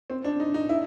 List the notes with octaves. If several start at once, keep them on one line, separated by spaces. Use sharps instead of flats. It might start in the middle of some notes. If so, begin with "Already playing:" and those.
C4
D4
D#4
D#4
E4